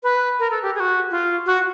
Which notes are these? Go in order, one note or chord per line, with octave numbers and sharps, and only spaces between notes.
B4
A#4
A4
G4
G#4
F#4
F4
F#4